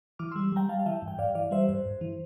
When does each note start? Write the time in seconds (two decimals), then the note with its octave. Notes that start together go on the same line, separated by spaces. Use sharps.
0.19 E3 D6 F6
0.31 G3 C6 E6
0.52 G3 G5 A#5
0.69 G3 F5 A5
0.79 F5
0.86 E3 E5 G5
1.02 G2
1.08 G5
1.18 G2 D5 F5
1.35 E3 D5 F5
1.51 G3 C5 E5
1.69 G2 C5
1.86 G2
2.01 E3